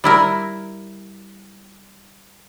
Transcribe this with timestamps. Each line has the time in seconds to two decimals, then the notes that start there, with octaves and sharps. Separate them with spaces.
0.04 G3 E4 A#4